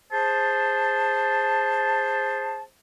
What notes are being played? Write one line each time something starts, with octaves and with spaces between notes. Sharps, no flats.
G#4 C5 A5